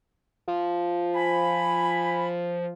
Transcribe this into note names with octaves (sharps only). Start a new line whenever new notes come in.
F3
G#5 B5